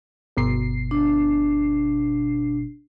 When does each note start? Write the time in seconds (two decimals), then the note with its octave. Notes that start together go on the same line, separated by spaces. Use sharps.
0.37 G1 B2 C7
0.91 D4